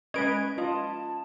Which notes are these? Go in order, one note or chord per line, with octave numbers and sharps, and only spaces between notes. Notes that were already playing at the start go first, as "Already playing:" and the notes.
G#3 C#4 B4 D#5 G#6 D7
F4 D#5 A5